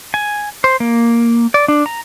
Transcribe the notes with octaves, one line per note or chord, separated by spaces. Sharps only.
G#5
C5
A#3
D5
D4
A#5